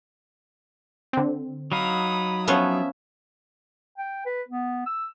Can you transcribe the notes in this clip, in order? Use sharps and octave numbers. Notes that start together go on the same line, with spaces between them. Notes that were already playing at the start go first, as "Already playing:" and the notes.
D3 C4
F#3 D#4 F5 B5 D#6
F3 B3 C#4 E5
G5
B4
B3
E6